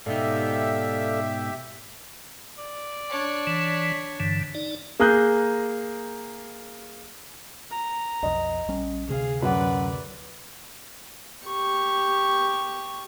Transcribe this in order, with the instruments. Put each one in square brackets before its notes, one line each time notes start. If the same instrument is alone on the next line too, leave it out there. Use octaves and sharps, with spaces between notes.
[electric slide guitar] G#2 B2 D#4 [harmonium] G4 E5 [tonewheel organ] A4 D5 F5
[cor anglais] D5
[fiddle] D4 C#5
[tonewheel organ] E3
G2 D3 E3
D#4 D5
[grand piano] A#3 G#4 A#5 F#6 G6
[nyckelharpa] A#5
[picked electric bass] B1 F2 [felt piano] D#5
[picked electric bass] A#1 G3 C#4
[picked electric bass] D2 C3 [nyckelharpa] G#4 F5
[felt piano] F#2 F#5 [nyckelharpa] B4 D5
[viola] G4 C#6